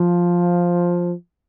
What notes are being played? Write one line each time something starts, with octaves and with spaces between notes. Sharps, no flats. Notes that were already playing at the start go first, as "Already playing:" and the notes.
Already playing: F3